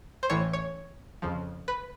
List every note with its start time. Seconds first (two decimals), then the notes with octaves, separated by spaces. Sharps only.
0.23 C5
0.30 A1 A2 E3 C#5
0.53 C#5
1.22 F2 C#3 F3
1.68 B4